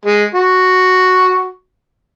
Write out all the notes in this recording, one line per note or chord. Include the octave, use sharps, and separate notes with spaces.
G#3
F#4